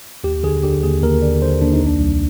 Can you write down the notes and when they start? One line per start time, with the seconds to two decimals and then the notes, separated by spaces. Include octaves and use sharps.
0.24 D#2 G4
0.43 D3 G#4
0.63 D3 G4
0.83 D#2 G#4
1.03 D#2 A#4
1.22 D3 D5
1.42 D3 C5
1.61 D#2 D4
1.73 D#4
1.82 C2 D4
2.00 C2